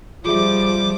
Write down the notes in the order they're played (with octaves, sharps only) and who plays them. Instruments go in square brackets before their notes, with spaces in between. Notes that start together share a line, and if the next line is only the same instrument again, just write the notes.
[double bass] F3 G3 [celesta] F4 G#4 E5 [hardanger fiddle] D6